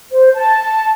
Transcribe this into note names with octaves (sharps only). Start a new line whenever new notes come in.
C5
A5